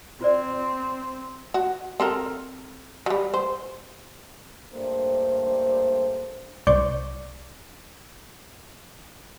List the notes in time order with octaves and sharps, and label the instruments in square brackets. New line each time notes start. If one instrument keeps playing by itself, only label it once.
[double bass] C4 [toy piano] F4 C5 D5
[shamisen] F#4
C4 A4 A#4
F#3 G3
C5
[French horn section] G2 A3 A#3 C5
[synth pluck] C2 C5 D5 C#6 D6 G6